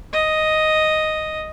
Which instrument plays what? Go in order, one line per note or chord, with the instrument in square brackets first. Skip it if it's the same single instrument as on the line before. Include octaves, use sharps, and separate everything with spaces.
[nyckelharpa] D#5